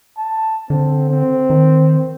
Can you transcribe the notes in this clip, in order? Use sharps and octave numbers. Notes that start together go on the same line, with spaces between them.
A5
D3 C4
C4
D#3